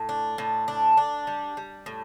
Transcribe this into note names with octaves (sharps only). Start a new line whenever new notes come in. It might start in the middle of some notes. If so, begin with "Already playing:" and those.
Already playing: A2
D4
A2
D4
D4
G3
G3
A2